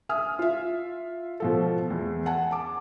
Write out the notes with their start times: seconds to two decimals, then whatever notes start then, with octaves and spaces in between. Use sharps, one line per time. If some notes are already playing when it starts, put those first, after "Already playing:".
0.09 E5 G#5 D#6 F6
0.39 F4 E5
1.40 B2 F3 A4
1.90 E2
2.26 F#5 G#5 A5
2.51 A5 D6